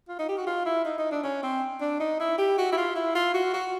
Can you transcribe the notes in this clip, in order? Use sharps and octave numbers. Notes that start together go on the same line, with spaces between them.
F4
D#4
G4
F#4
F4
E4
D#4
D#4
D4
C#4
C4
D4
D#4
E4
G4
F#4
E4
F4
E4
F4
F#4
F#4